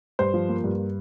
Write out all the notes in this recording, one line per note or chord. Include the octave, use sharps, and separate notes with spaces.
G2 C5
F3
A#3
G2